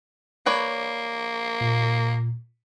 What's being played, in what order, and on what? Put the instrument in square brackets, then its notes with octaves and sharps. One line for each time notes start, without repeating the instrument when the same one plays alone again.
[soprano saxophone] A#3 [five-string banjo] B4 C#5 D5
[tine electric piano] A#2